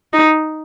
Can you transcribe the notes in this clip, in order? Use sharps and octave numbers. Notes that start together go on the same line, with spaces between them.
D#4